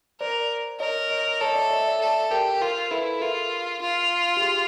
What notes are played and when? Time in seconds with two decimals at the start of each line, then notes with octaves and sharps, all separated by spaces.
0.20 A#4 C5 D5
0.80 A#4 C#5 D#5
1.10 C#5 D#5
1.41 A4 C#5 D#5
1.55 D5 E5
1.70 D5 E5
1.86 D5 E5
2.01 A4
2.30 G4 A#4 C5
2.60 F4 A#4 C5
2.91 E4 A4 B4
3.20 F4 G#4 A#4
3.81 F4
4.37 G4
4.42 G#4